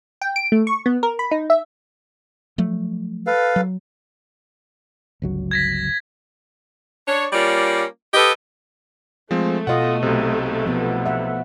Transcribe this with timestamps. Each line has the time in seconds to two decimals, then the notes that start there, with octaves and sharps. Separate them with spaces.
0.22 G5
0.36 D7
0.52 A3
0.67 C#6
0.86 B3
1.03 A#4
1.19 B5
1.31 D#4
1.50 E5
2.58 F3 F#3 A3
3.27 A4 B4 F5
3.56 F#3
5.22 G1 C#2 F#3
5.51 G#6 A#6 B6
7.08 D4 C#5
7.32 G3 A#3 C#4 F4 D5
8.14 G4 A4 B4 D#5
9.31 F3 G#3 A3 C4
9.67 B2 F4 D#5 F#5
10.03 B1 C3
10.66 F3 B3
11.06 E5 F#5